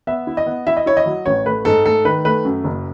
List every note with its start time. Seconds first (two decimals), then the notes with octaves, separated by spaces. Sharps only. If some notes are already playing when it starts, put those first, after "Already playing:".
0.07 B3 E5
0.27 E4
0.37 D#5
0.46 B3
0.67 E4 E5
0.77 D#5
0.86 E4 C#5
0.97 D#5
1.06 F#3
1.26 A1 C#5
1.46 A3 B4
1.65 G#2 A4
1.86 A3 A4
2.05 D#3 B4
2.25 A3 B4
2.45 F#2
2.64 F#1